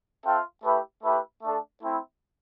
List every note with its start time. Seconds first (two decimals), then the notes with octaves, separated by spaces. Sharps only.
0.25 C4 F4 A4 E5 G5
0.64 A3 E4 G4 B4
1.03 A3 E4 G4 B4
1.43 A3 D4 A4
1.82 A3 C4 E4